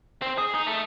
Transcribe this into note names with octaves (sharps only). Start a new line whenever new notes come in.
C4
G#4
D#4
A3